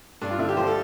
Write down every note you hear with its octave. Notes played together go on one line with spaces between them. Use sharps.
G2 D4
F4
D3 E4
G4
F3 C5
A4